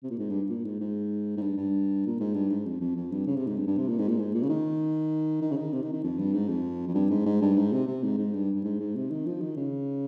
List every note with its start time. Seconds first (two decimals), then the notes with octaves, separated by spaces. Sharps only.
0.03 C3
0.10 A#2
0.19 G#2
0.30 G2
0.49 A#2
0.65 G#2
0.80 G#2
1.37 G#2
1.41 G2
1.57 G2
2.06 A#2
2.20 G#2
2.34 G2
2.50 G#2
2.66 F2
2.80 F2
2.96 F2
3.12 G2
3.27 C#3
3.36 C3
3.47 G#2
3.57 G2
3.67 G2
3.77 C3
3.88 A#2
3.98 G#2
4.09 A#2
4.18 G#2
4.34 A#2
4.43 C#3
4.49 D#3
5.41 D#3
5.51 C#3
5.56 D#3
5.73 C3
5.82 D#3
5.93 D#3
6.04 F2
6.19 G2
6.34 G#2
6.48 F2
6.88 F2
6.95 G2
7.10 G#2
7.25 G#2
7.41 G2
7.57 G#2
7.72 C3
7.87 C3
8.03 G#2
8.18 G#2
8.34 G2
8.55 G2
8.64 G#2
8.80 G#2
8.95 C3
9.10 D#3
9.26 F3
9.41 D#3
9.57 C#3